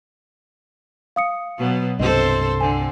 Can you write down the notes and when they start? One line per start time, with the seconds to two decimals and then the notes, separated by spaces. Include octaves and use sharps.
1.16 F5 D#6 C#7
1.58 B2 F#3 B3
2.00 C2 G2 C4 A4 C5 D#5
2.61 D3 C4 G#5